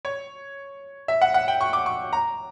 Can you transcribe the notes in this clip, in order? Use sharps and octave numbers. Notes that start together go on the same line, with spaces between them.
C#5
E5
F#5
F#5
G5
C#6
D6
C#6
A#5